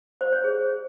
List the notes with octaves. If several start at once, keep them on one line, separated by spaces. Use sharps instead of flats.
C5
C#5
G#4